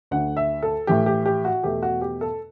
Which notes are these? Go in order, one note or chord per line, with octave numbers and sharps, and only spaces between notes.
D2 D3 A3 F#5
E5
A4
A2 E3 A3 G4
G4
G4
F#4
E2 B2 A3 G4
F#4
G4
A4